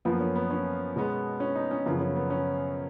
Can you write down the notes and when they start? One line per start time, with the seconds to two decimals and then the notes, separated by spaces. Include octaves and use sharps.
0.05 F#2 F3 A#3 B3
0.20 C#4
0.36 B3
0.51 C#4
0.96 B2 G#3 B3
1.40 C#4
1.55 D#4
1.71 C#4
1.86 F#2 C#3 F3 B3
2.00 C#4
2.16 B3
2.30 C#4